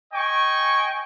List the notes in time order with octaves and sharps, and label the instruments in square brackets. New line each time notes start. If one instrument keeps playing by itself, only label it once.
[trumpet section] D#5 G5 G#5 C#6